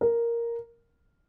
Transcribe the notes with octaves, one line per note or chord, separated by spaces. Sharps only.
A#4